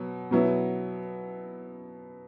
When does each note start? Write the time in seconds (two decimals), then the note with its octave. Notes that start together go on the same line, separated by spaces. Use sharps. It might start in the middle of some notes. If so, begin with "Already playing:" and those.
Already playing: B2 F#3
0.31 B2 F#3 B3 E4